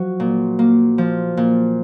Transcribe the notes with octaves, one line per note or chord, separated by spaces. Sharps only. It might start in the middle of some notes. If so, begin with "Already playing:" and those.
Already playing: F3 F#3 F#4
A#2
A#3
F3
A#2